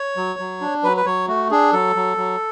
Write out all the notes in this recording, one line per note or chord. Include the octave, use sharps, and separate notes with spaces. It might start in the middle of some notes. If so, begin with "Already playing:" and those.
Already playing: C#5
F#3
F#3
D4
F#3 B4
B4
F#3 C#5
A3 F#4
D4 G#4
F#3 A4
F#3
F#3